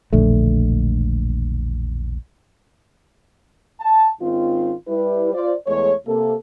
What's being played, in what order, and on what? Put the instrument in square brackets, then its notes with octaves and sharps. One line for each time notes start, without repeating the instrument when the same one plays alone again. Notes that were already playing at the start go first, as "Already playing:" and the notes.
[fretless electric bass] E1 A#1 D3 A3
[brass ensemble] A5
G#2 D#3 C4 C#4 F4
G3 E4 B4
F4 C5 D5
E2 G#3 A3 C#5
C3 A#3 A4